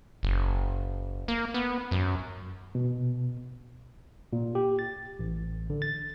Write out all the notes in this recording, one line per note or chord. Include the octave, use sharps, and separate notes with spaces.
F#1
A#3
B3
F#2
B2
A#2
G4
A6
A1
D3
A6